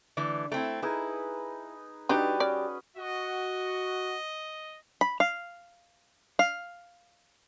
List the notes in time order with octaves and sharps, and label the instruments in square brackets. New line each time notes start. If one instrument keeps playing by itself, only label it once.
[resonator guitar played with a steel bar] D3 E3 A3
A3 C4 E4
[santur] D#4 G#4 B4 [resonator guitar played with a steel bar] E4
[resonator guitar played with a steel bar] G3 G4 [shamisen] D4 D#4 [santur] F#4 B4 D#5
[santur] C#4 [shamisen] D5
[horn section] F#4 [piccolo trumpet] D#5
[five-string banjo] B5
F5
F5